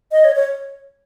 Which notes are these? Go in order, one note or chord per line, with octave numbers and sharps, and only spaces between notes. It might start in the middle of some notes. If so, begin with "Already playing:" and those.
D#5
C#5
C#5